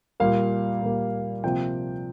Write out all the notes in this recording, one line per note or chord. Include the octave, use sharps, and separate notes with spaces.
A#2 G3 A#3 F5
A#2 G3 A#3
C3 F3 A#3 G5